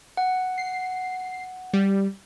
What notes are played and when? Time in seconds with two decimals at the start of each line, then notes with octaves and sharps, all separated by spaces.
0.17 F#5
0.58 C7
1.74 G3